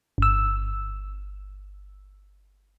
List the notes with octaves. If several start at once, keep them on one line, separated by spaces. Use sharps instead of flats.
G1 E6